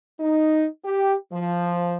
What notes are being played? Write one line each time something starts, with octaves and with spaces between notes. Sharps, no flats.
D#4
G4
F3